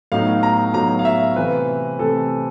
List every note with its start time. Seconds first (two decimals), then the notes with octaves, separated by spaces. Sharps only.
0.12 A2 F#3 B3 D#4 F5
0.43 A#5
0.74 A2 F#3 B3 D#4 A#5
0.99 F5
1.05 E5
1.36 C3 E3 A3 C4 B4
1.98 C3 E3 A3 C4 A4